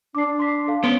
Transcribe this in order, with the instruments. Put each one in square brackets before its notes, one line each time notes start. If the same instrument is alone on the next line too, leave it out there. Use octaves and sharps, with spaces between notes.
[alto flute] D4 [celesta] D6 C7
[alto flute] D4
[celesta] C6 D6 B6
A4 F5
[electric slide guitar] B3 C#4 [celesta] C6 D7 G7